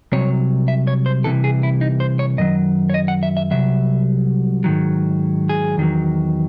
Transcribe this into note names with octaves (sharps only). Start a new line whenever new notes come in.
C2 C3 F#3 C#5
E5
C#5
C5
C2 C3 E3 A4
G#4
E4
D#4
C5
C#5
F#2 D#3 F#3 D#5
C#5
D#5
F#5
E5
E5
C2 C3 F#3 E5
G#2 D#3 F#3
G#4
E2 D#3 F#3